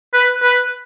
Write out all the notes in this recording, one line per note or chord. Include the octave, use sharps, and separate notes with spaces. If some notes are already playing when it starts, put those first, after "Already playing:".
B4
B4